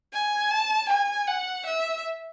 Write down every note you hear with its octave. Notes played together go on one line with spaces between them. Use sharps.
G#5
A5
G#5
F#5
E5